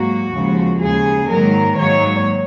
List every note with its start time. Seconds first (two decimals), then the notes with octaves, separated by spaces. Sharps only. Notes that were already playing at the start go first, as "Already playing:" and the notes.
Already playing: G#2 F#3 A#3 F#4
0.32 D#2 C#3 F3 G#3
0.80 D#2 C#3 G#3 G#4
1.28 G#2 D#3 F#3 A#3 A#4
1.76 G#2 D#3 F#3 A#3 C#5